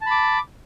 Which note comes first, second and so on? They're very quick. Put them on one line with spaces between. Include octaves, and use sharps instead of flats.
A5 B5 D6